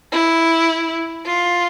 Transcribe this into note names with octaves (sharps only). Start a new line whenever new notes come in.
E4
F4